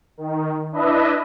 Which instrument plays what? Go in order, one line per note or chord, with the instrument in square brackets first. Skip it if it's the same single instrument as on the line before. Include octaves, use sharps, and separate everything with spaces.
[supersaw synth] D#3
D4 E4 B4 D#5 E5